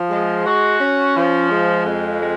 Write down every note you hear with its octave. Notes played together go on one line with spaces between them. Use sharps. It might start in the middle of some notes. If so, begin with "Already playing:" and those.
Already playing: F3
G#3
F#4
C#4
F3
G#3
F2
G#3